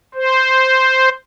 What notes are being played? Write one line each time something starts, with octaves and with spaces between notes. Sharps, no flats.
C5